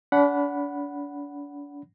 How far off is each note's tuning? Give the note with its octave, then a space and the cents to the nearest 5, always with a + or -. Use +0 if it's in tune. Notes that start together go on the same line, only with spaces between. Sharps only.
D4 -40 F#5 +0 B5 +0